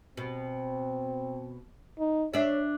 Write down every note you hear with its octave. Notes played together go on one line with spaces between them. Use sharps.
B2 C4
D#4
D4 C#5 E5